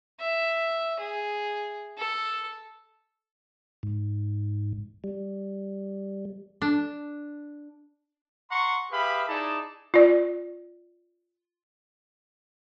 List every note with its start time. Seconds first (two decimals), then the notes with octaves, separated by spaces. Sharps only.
0.20 E5
1.00 G#4
1.98 A4
3.83 G#2
5.04 G3
6.62 D4
8.51 F#5 A#5 C6 C#6
8.91 G4 G#4 B4 E5 F5 B5
9.28 D#4 E4 G#4 D5 G#5 A5
9.94 F4 D5